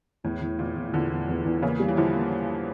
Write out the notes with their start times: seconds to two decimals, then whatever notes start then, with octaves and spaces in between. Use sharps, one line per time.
0.24 E2 A2
0.41 E2
0.59 E2 A#2
0.76 E2
0.93 E2 A#2 D3
1.10 E2
1.29 E2
1.45 E2
1.62 C#3 E3 A#3
1.80 G3
1.88 E3
1.97 D3 F3 E4
2.14 A#3